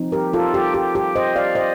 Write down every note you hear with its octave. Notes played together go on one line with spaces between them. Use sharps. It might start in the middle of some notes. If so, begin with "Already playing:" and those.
Already playing: F3 C4 D#4
G4 A#4
F4 A4
G4
G4
G4
C5 D#5
D5 F5
C5 D#5